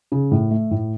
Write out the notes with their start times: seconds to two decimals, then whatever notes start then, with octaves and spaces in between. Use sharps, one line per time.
0.12 C#3
0.31 A2
0.51 A3
0.71 A2